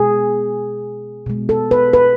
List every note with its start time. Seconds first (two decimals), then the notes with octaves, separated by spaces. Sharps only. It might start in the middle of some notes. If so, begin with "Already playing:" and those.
Already playing: B2 G#3 G#4
1.26 B2 G#3
1.49 A4
1.71 B4
1.93 B4